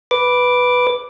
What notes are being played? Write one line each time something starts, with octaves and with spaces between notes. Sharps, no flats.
B4 D6